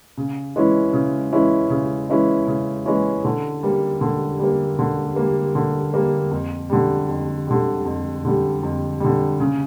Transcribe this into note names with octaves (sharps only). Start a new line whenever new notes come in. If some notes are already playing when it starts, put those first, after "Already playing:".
C#3
E3 G#3 C#4 E4
C#3
E3 G#3 C#4 E4
C#3
E3 G#3 C#4 E4
C#3
E3 G#3 C#4 E4
D3
G3 A#3
D3
G3 A#3
D3
G3 A#3
D3
G3 A#3
F2
D3 G3
F2
D3 G3
F2
D3 G3
F2
D3 G3
C#3